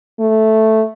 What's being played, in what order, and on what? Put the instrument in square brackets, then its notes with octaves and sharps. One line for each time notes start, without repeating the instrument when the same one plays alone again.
[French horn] A3